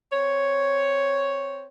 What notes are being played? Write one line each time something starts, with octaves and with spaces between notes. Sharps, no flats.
C4 C#5